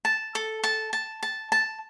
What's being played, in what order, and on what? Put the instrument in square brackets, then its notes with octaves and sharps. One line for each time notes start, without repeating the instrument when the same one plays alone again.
[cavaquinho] A5
A4
A5
A5
A5
A5